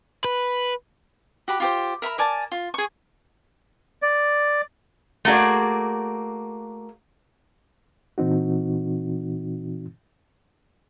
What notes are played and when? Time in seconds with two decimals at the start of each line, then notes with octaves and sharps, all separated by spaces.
0.24 B4
1.48 F#4 G4 B5
1.60 F4 G4 C5
2.02 A#4 E5 A#5 B5
2.18 A#4 D5 G#5 A5
2.52 F4
2.74 G#4 C#6
4.02 D5
5.25 A3 A#3 F#4 G#4 D5
8.18 A#2 E3 C4 D#4 F#4